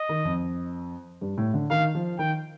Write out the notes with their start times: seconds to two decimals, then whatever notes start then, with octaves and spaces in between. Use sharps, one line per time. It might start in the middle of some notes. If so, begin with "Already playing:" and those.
Already playing: D#5
0.09 D#3
0.25 F2
1.21 G2
1.38 A2
1.54 D3
1.70 D#3 F5
1.95 F3
2.18 D#3 G5